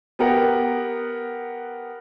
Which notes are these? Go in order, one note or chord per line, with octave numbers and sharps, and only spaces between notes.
B3 G4 A#4 F#5